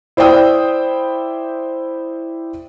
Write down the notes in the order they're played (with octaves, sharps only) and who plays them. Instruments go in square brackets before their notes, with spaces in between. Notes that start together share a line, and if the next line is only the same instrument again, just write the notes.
[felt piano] E4 C5 D5 G5 D#6 E6